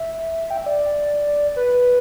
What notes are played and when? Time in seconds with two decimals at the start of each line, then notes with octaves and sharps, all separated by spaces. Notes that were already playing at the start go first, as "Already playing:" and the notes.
Already playing: E5
0.50 G5
0.58 E5
0.66 D5
1.56 B4